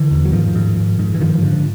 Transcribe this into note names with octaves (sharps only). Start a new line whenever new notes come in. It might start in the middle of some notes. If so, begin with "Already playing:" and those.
Already playing: D3 E3
E2
F#3
G#2 D#3 F3
G#2
G#2
G#2
E3
G2 D#3 F3
D3